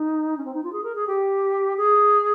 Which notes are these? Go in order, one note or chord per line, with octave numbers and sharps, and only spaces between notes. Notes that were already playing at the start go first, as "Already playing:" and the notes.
Already playing: D#4
C#4
C4
D#4
F4
G#4
A#4
G#4
G4
G#4